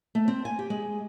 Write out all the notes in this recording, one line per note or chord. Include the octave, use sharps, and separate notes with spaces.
A3
C4
G#5
G4
G#3